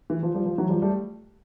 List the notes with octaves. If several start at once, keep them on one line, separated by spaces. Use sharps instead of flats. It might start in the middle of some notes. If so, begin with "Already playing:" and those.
E3
F3
F3 G3
F3
E3 F#3
F3 G3
G3 A3